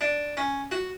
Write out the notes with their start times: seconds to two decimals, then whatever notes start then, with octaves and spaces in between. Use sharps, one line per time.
0.01 D4
0.37 C#4
0.71 F#4